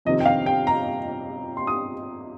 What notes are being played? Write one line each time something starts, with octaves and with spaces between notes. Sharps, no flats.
F2 C3 D#3 C4 D#5
G5
F5
G5
A#5
C6
D#6